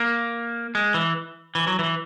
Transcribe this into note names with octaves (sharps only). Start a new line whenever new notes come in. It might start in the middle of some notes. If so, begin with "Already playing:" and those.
Already playing: A#3
G#3
E3
E3
F#3
E3